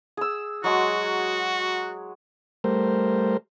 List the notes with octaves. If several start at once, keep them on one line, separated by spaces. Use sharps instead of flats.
G#4 E6
F#3 G#3 F#4
G3 A3 A#4 C5